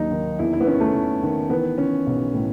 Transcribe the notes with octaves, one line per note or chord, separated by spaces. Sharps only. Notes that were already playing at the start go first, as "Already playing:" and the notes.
Already playing: D#2 D#3 F#3 D#4
D#3
E2 E4
E4
B3
D#3 C#4
A3
D#3
D#3
E3 B3
E3 C#4
B1
A2